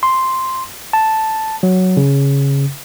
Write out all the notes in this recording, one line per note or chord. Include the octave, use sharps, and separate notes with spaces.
C6
A5
F#3
C#3